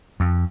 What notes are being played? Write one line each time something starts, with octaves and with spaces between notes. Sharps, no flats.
F2